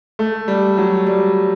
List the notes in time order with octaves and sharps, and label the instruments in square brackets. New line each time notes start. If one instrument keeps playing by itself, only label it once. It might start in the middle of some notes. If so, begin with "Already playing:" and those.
[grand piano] A3
G3
F#3
G3